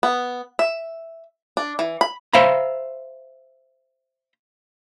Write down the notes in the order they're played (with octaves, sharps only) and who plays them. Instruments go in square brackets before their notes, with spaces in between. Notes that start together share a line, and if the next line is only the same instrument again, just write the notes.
[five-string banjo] B3
E5
D4
E3
B5
[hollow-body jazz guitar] C5 E5 F5 A#5 B5